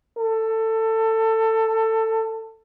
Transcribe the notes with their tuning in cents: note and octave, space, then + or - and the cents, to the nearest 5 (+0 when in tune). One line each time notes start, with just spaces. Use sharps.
A4 +20